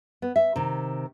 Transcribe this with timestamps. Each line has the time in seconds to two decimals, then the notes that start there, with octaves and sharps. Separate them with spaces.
0.22 B3
0.36 E5
0.56 C3 D#3